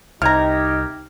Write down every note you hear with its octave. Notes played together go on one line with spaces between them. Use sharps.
C2 C3 D#4 G4 A#5 F6 G#6 A#6